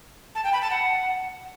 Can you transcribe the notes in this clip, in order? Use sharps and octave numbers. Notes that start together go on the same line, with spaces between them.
A5
G5
B5
A5
F#5